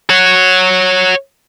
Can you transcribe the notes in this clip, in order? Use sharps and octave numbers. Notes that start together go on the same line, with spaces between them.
C#5 F#5